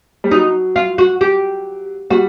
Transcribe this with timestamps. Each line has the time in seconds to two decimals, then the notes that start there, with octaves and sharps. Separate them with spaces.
0.24 G3
0.31 F#3 D#4
0.76 F4
0.98 F#4
1.21 G4
2.10 G3 F#4